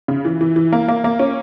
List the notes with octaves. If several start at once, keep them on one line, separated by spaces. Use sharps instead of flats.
C#3
E3
E3
E3
A#3
A#3
A#3
C#4